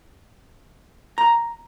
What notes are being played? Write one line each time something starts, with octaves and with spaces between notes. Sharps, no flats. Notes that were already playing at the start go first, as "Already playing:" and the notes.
A#5